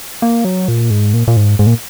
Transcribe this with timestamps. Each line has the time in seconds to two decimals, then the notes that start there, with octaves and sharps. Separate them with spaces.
0.22 A#3
0.45 F#3
0.68 A#2
0.90 G#2
1.14 A#2
1.27 A#2
1.37 G#2
1.59 G#2
1.67 A#2